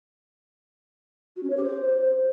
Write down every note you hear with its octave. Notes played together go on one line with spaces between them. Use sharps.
F#4
C#4
C#5
G4
C5